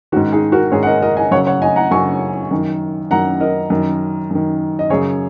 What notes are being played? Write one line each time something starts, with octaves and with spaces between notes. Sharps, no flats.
G#2 D#3 C#4 F#4
D#4 G#4
F#4 A#4
G#2 D#3 G#4 C#5
F#5
A#4 D#5
A#4 D#5
D#5 G#5
F#2 C#3 C#5 F#5
C#5 F#5
D#5 G#5
F#5 A#5
F#2 C#3 G#5 C#6
F#2 D#3
F#2 D#3 F#5 A#5
A#4 D#5
F#2 D#3
F#2 D#3
D#5
F#2 C#3 G#4 C#5